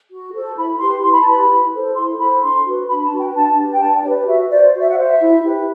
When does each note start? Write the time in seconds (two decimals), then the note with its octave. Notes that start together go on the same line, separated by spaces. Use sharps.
0.10 F#4
0.33 A4 C5
0.57 E4 B5
0.80 G4 B4 C6
1.03 E4 C6
1.12 B5
1.22 A5
1.27 G4 B4 B5
1.50 E4
1.73 A4 C5
1.96 E4 C6
2.19 A4 C5 B5
2.42 D4 C6
2.65 F#4 B4
2.89 D4 B5
3.04 A5
3.12 F#4 B4
3.20 G5
3.35 D4 A5
3.58 G4 B4
3.73 G5
3.81 D4 A5
4.04 G4 D5
4.08 B4
4.28 F#4 E5
4.51 C5 D5
4.74 F#4
4.81 E5
4.89 F#5
4.97 C5
5.05 E5
5.20 E4
5.43 G4 B4